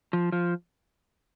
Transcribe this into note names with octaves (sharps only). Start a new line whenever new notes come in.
F3
F3